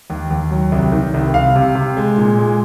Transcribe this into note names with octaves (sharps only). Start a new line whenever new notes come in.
D#2
D#2
F#3
C2
D#3
C2
C2 F5
C3
C3
G#3
A#2
G#3